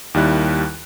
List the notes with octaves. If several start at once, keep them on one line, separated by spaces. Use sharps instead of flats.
D#2 D#3 G3 E4 F#6